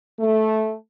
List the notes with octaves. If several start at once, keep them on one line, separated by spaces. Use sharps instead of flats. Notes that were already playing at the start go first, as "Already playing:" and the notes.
A3